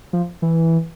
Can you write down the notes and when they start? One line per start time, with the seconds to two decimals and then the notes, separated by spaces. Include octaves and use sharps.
0.13 F3
0.42 E3